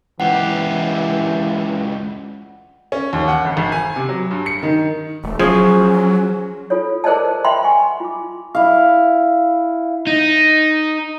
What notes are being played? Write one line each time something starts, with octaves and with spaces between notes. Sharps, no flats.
C#2 E3 G4 F#5
C#4
D#2
F#5
G#1
G#1
G#5
C3
F#3
G2
C#7
D#3
D#1 A3
F3 F#3 C#4 G#4
F4 A4 C#5
G#4 A#4 C5 D5 D#5 A5
D#5 E5 G5 B5 C6
F#5 G#5 C#6
F4 D6
E4 F5
D#4